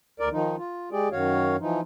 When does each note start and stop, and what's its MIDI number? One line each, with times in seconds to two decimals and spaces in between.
0.20 0.29 38
0.20 0.29 70
0.20 0.29 74
0.32 0.56 51
0.32 0.56 53
0.32 0.56 63
0.58 0.89 65
0.91 1.09 56
0.91 1.09 67
0.91 1.09 68
0.91 1.09 74
1.12 1.56 42
1.12 1.56 51
1.12 1.56 66
1.12 1.56 73
1.12 1.56 77
1.60 1.81 52
1.60 1.81 53
1.60 1.81 63